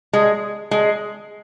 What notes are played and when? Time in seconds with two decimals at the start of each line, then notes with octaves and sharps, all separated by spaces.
0.13 G#3
0.71 G#3